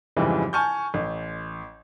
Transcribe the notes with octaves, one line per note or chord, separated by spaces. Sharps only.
F2 G#2 C#3 E3 G3
G#5 A5 C#6 F6 G6
A1